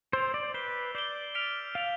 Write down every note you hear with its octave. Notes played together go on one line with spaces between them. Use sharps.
C5 E6 A6 D7 F7
D5
B4 G6 C7 E7 G7
D5 G6 C7 E7 G7
F6 B6 D7 F7
F5 A6 D7 F7